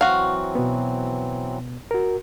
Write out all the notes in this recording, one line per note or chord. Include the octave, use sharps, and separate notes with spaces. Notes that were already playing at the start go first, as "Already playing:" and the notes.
E3 F#3 C4 F#4 F5 F#5
B2 B3
F#4 A#4